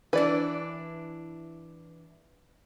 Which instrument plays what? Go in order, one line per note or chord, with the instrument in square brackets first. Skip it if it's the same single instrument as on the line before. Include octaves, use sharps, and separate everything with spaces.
[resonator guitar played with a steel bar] E3 D4 [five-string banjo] B4 D5